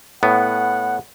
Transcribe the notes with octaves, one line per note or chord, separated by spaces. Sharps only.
A2 B3 F#5